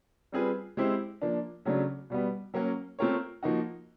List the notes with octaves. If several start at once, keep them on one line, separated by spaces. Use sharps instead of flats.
G3 C4 F4 G#4 B4
G#3 C4 E4 G4 C5
F3 A#3 D4
C#3 F#3 A3 D4
B2 G3 B3
F#3 A#3 C#4 F#4
A3 C4 F4 A#4 C#5
F3 A#3 D#4 F#4